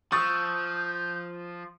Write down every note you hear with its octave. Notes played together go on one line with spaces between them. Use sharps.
F3 C#6 D#6 E6 G6 A6